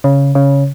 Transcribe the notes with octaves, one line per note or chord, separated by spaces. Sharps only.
C#3
C#3